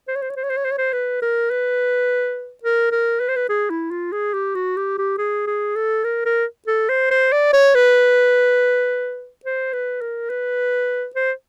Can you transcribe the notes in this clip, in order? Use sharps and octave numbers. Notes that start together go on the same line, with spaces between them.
C5
C#5
C5
C#5
C5
C#5
C5
C#5
C5
C#5
C5
B4
A#4
B4
A#4
A#4
B4
C5
B4
G#4
E4
F4
G#4
G4
F#4
G4
G4
G#4
G#4
A4
A#4
A#4
A4
C5
C5
D5
C#5
B4
C5
B4
A#4
B4
C5